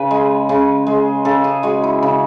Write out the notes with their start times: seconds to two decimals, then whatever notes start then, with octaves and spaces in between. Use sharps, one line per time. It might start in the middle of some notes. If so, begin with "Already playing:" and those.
Already playing: C#3 B4
0.11 G#3
0.49 C#3
0.86 G#3
1.25 C#3 A4
1.44 G#4
1.63 G#3 F#4
1.83 E4
2.03 C#3